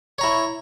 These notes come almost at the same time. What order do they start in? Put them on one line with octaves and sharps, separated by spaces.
C#5 A#5 E4